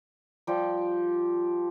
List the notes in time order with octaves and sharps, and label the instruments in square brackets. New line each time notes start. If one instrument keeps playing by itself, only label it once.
[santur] F3 G3 G4